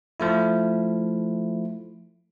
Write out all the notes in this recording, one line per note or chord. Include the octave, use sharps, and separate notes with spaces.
F3 A3 E4